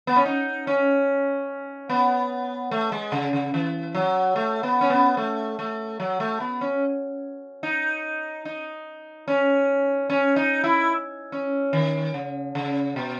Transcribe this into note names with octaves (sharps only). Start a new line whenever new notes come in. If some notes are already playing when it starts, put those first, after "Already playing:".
B3
C#4
D#4
C#4
B3
A3
G#3
C#3
C#3
E3
F#3
A3
B3
C#4
B3
A3
A3
F#3
A3
B3
C#4
D#4
D#4
C#4
C#4
D#4
E4
C#4
D#3
C#3
C#3
B2